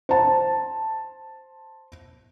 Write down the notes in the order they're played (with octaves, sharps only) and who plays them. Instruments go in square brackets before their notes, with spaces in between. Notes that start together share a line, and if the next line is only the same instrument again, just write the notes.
[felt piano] C5 A5